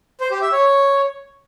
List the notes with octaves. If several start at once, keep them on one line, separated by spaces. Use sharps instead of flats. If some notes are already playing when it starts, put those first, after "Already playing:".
C5
G4
E5
C#5